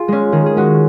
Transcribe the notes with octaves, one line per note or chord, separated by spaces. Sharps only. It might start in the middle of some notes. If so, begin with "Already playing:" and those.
Already playing: F4 G#4
G#3 C#4
D#3 G#4
G#4
G#3 C#4 F#4